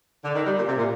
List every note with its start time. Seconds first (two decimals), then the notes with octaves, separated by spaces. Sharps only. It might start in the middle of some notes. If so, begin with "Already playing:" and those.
0.24 D3
0.35 D#3
0.46 G3
0.57 A#2
0.67 C3
0.78 A#2